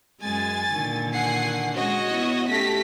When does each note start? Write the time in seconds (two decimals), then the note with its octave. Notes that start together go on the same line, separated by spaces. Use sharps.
0.22 F#2 G#3 G#5 A6
0.72 A#2 D3 D#3
1.15 F#5 G#5 C7
1.76 G#3 C#4 F#4 C#5 D#5
2.11 B3 E4
2.49 A3 C#4 G4 A#6 B6